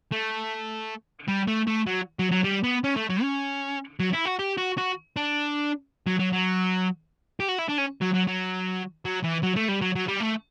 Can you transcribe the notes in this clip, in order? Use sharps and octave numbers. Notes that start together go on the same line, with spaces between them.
A3
G3
A3
A3
F#3
F#3
F#3
G3
B3
C#4
A3
F#3
C#4
F#3
E4
F#4
G4
F#4
F#4
D4
F#3
F#3
F#3
G4
F#4
E4
D4
C#4
F#3
F#3
F#3
F#3
E3
F#3
A3
G3
F#3
F#3
G3
A3